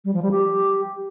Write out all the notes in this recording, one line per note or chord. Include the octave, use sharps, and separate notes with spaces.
G3
F3
G3
G4